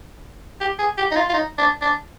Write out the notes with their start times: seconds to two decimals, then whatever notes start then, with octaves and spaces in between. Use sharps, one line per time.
0.61 G4
0.79 G#4
0.98 G4
1.11 D#4
1.16 F4
1.29 F4
1.34 D#4
1.58 D4
1.81 D4